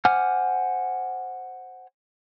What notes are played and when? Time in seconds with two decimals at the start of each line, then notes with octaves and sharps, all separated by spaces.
0.05 C5 F#5 G#5 D6 F6